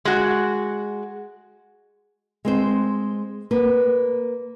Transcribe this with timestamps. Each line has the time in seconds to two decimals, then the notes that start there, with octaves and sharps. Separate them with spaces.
0.05 G#3 F#4
2.45 G#3 C4 C5
3.51 A#3 B4